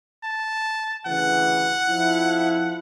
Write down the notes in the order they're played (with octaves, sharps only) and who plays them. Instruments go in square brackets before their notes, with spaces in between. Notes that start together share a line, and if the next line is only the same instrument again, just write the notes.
[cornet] A5
[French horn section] D2 C#3 E3 [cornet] F#5
[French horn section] F2 F3 E4